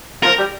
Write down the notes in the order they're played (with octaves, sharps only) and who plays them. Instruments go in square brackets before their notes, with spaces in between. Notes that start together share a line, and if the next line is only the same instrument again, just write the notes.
[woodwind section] F3 F4 [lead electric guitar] A#4
[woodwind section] G3 G4